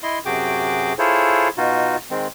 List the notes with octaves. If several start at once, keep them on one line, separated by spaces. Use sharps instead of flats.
E4 D#5 C6
F#2 C3 F#4 G#4 G5 D6
E4 F4 G#4 A4 C5 C#5
B2 D#4 F4 F#4
D#3 G#3 C4